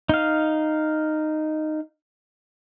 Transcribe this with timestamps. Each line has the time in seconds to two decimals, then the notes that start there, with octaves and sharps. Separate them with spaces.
0.09 D#4 F5